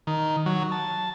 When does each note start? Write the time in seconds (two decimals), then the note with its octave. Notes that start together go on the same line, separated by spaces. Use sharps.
0.07 D#3
0.46 F#3
0.72 A5